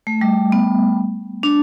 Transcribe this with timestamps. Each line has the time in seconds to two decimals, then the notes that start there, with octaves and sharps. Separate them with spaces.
0.07 A3
0.21 G3
0.52 B3
1.43 D4